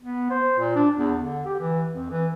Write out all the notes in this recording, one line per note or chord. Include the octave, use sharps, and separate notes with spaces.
B3
C5
A#2
D4
E2
D3
G4
E3
F2
E3